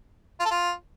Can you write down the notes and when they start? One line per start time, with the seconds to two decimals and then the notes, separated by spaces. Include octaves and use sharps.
0.40 F4
0.45 A4
0.51 F4